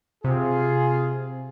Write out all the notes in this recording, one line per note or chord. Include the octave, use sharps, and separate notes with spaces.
C3 F4 G#4